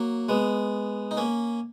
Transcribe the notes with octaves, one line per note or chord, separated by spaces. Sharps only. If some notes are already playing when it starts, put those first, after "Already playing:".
Already playing: F#3 A#3
G#3 B3
D#4
A#3 C#4